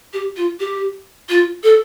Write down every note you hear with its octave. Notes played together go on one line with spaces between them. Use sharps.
G4
F4
G4
F4
A4